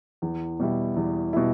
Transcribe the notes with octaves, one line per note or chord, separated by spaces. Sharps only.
E2
B2 G3 E4
E2
B2 G3 E4